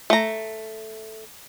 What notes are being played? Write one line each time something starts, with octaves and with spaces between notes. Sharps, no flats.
A3 A#5